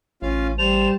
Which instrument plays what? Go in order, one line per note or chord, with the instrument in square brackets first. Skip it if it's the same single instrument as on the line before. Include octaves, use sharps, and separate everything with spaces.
[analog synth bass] A1 [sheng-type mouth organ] C#4 F4 F5
[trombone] G3 [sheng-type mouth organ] C5 A5 [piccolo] F7